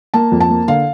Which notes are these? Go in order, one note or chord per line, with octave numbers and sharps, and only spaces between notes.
A#3 A5
F2
A5
A#3
D3 F5